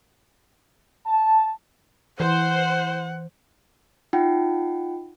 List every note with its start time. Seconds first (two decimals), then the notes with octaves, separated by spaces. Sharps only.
1.06 A5
2.20 E3 C5 F#5
4.13 D#4 F4 F#5 G5